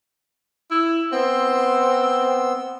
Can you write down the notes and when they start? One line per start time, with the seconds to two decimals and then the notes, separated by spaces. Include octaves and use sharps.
0.71 E4
1.12 B3 C4 C6 E6